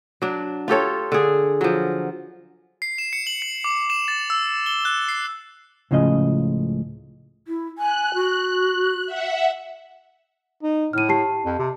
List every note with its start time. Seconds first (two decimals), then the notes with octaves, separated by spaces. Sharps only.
0.22 F#3 D4
0.68 F4 G4 A4 C#5
1.12 D3 G#4
1.61 F3 F#3
2.82 C7
2.98 E7
3.13 C#7
3.27 F#7
3.42 C#7
3.64 D6
3.90 E7
4.08 A6
4.30 E6
4.66 G7
4.85 F#6
5.08 C7
5.91 C#2 A2 C#3 F3 D#5
7.48 E4
7.78 G#5 F#6
8.14 F#4
9.06 E5 F#5
10.63 D#4
10.93 A2 F6 D#7
11.09 G4 A5 C7
11.45 F2
11.59 C3